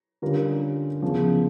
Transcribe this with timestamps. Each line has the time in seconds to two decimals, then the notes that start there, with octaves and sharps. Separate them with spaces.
0.22 D3 G3 C#4 F4 A#4
1.02 E2 C#3 F3